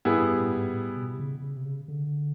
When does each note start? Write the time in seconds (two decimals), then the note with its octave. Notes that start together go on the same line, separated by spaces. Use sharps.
0.05 G#2 G3 B3 E4 G#4
0.22 G2
0.39 A2
0.57 G#2
0.74 A2
0.97 B2
1.14 C3
1.19 C#3
1.42 C#3
1.57 C3
1.65 C#3
1.88 D3